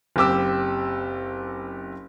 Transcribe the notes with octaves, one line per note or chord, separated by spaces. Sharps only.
F#1 C4 G4 D6 E6